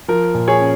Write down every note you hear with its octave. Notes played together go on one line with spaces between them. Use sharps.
F3 A#4
A#2
G#4 C#5
C#4